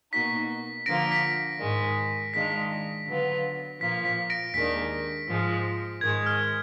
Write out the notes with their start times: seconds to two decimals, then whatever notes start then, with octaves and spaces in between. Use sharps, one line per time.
0.13 B2 A#3 D#4 F#4 B6
0.86 D3 F3 A#3 F4 A#6 D7
1.12 B6
1.60 G#2 D#3 G#3
2.34 D#3 G#3 D4 F4 B6
3.07 D3 F#3 B3 F4
3.81 A#2 F3 A#3 F4 B6
4.05 B6
4.30 A#6 D7
4.54 D#2 D#3 G#3 D4 B6
5.28 G#2 F3 G#3
6.01 G#2 D#3 G#3 G#6
6.26 F6